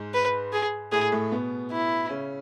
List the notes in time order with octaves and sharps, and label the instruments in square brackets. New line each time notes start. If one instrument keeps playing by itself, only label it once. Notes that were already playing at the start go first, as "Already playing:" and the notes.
Already playing: [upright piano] G#2 G#3
[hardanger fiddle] B4
G#4
[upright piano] A2 A3 [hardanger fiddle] G#4
[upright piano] A2 A3
B2 B3
[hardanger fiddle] E4
[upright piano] C#3 C#4